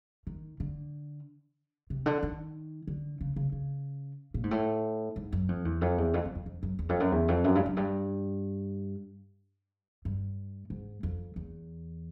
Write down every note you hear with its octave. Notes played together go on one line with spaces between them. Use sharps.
D#3
D3
C3
D3
D#3
D3
C#3
C#3
C#3
A#2
G#2
A2
G#2
F#2
F2
E2
F2
E2
F2
F2
F2
F2
F#2
E2
F2
F#2
E2
F2
F#2
G2
F#2
G2
G2
G#2
F2
E2